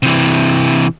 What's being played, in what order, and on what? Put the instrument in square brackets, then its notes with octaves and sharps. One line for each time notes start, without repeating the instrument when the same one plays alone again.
[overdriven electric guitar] C3 E3